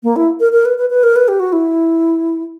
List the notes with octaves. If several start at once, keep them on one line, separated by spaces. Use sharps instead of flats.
A#3
E4
A#4
A#4
B4
B4
B4
A#4
B4
G4
F#4
E4